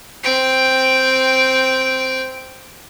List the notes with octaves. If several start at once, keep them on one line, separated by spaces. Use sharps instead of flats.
C4 G5